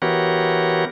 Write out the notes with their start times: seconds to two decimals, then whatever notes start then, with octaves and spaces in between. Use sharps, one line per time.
0.02 E3 B3 F#4 G4 A#4 C#5